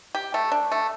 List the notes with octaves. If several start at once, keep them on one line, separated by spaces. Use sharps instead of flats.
G4
A3
D4
A3